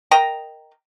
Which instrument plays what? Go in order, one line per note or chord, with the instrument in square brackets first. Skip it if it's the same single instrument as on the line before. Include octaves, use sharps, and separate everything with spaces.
[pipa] A#4 D#5 G5 A#5